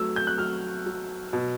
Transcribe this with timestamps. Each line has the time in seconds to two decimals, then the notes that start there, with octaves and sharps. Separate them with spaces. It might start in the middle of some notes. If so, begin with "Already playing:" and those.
Already playing: F#3 A3 E6
0.16 G6
0.27 F#6
0.38 F#3 F6
0.86 F#3
1.33 B2